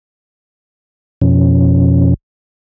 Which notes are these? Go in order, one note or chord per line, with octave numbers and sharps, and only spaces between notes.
F2 B2 F3 C#4